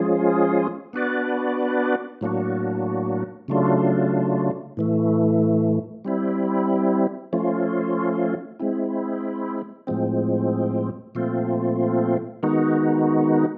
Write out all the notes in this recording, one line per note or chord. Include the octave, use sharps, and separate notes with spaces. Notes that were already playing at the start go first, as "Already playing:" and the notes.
Already playing: F3 G#3 C#4 F4 G#4
B3 D4 F#4 B4 D5
A2 F#3 A#3 D4 F#4
C#3 F#3 A3 D4 F4
A2 E3 A3
G3 C4 E4
F3 A3 C#4 F4
G#3 C4 E4
A2 F3 G#3 C4
A#2 F3 A3 C4 F4
D#3 G#3 B3 D#4 F#4